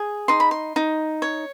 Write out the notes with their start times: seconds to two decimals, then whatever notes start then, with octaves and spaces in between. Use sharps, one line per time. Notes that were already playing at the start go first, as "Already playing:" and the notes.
Already playing: G#4
0.28 D#4 C6
0.40 B5
0.51 C6
0.76 D#4
1.22 C#5